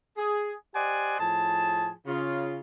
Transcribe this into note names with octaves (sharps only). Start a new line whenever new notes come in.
G#4
G4 C5 D5 D#5 F#5 G#5
A2 F3 G#4 A5
C#3 F4